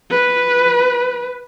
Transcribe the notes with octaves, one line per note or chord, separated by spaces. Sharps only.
B4